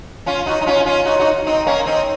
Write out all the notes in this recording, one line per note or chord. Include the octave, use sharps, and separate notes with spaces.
C#4 F4
D#4 F#4
D#4
C#4 F4
C#4 F4
D#4 F#4
D#4 F#4
C4 D#4
A#3 C#4
C4 D#4